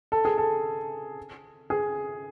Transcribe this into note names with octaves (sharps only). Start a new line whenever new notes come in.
A4
G#4
A4
G#4